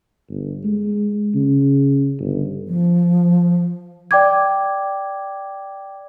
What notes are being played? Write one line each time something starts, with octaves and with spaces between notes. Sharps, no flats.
G1
G#3
C#3
G1
F3
D5 G5 D6 G#6